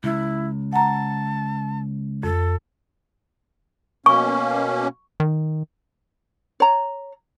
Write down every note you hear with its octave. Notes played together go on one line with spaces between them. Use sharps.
C#2 E4
F#5 A5 A#5
F2 A4
B2 A#3 C#4 C#6
D#3
C#5 A#5